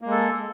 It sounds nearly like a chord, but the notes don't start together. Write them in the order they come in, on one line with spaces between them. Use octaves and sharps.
A#3 G#3 A4